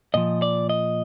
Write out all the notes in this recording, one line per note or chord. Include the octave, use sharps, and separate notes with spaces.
A#2 F3 D#5
D5
D#5